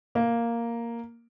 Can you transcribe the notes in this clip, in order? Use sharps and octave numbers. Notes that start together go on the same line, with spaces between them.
A#3